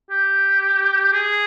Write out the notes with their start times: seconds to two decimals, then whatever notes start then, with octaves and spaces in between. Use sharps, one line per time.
0.11 G4
1.13 G#4